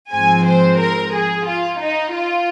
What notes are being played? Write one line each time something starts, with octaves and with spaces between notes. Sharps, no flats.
G#2 F3 G#3 C4 G#5
C5
A#4
G#4
F4
D#4
F4